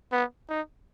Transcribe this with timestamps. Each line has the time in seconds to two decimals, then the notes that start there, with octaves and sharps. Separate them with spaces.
0.12 B3
0.49 D#4